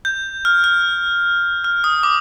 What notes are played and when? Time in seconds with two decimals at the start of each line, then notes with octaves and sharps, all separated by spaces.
0.05 G6
0.45 F6
0.64 F6
1.64 F6
1.84 D#6
2.03 D6